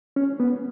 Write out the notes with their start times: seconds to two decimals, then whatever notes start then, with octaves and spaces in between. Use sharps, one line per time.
0.16 C#4
0.40 B3